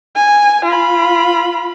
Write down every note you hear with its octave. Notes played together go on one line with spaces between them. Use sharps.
G#5
F4 B5